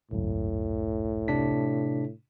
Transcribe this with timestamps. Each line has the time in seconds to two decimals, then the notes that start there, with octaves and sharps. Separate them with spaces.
0.11 G#1 C#2 F#2 A2
1.28 C3 D4 B6